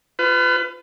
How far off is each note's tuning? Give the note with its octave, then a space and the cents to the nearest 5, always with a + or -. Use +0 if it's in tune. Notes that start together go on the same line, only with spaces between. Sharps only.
F4 -10 B4 +30